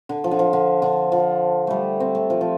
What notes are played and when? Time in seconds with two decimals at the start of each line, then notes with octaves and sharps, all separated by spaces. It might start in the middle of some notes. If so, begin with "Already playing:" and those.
0.09 D3
0.24 F3
0.31 D3
0.39 F3
0.53 D3
0.82 D3
1.12 F3
1.67 G3 A3
2.00 C4
2.15 A3
2.30 F3
2.41 F3